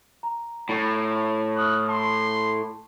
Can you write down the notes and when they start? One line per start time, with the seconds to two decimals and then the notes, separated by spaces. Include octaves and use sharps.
0.23 A#5
0.69 A2
1.56 C#6 D#6 F6 F#6
1.89 A5 C6